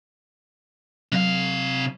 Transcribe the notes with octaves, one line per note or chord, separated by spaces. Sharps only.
C3 F#3 F5